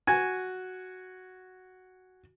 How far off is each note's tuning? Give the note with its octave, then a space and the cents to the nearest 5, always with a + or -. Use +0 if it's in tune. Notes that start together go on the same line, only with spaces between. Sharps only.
F#4 +0 G#5 +0